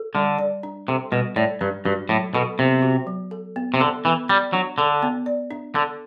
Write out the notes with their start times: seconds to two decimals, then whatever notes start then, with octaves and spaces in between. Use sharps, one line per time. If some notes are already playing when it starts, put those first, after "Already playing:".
Already playing: A4
0.15 D3 G3
0.38 D5
0.63 D4
0.88 C3 A4
1.12 B2 G3
1.36 A2 D5
1.61 G2 D4
1.85 G2 F#4
2.09 A2 F#3
2.35 B2 A4
2.59 C3 B3
2.82 F#4
3.07 F#3
3.31 A4
3.56 B3
3.74 C3
3.80 D3 A4
4.05 E3 B3
4.29 G3 D5
4.53 F#3 D4
4.78 D3 A4
5.03 B3
5.26 D5
5.51 D4
5.75 D3 A4